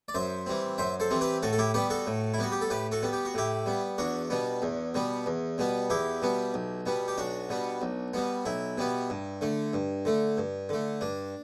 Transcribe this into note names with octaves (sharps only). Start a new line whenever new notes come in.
D5
F#2 C5 E5
E3 G3 C4
F#2 C5 E5
A4 C5
E3 G3 C4
G4 B4
A2 F#4 A4
A4
E4 G4
G3 B3 G4 B4
F#4 A4
A2
E4
G3 B3 F#4
G4
A4
A2 G4 B4
F#4 A4
G3 B3
G4
F#4
A2 E4 G4
G3 B3
E2 D4 F#4
B2 G3 B3
E2
B2 G3 B3
E2
B2 G3 B3
E2 E4 G4
B2 G3 B3
B1
B2 G3 B3
G4
B1 D4 F#4
B2 G3 B3
B1
B2 G3 B3
B1 E4
B2 G3 B3
G2
D3 A3
G2
D3 A3
G2
D3 A3
G2 D4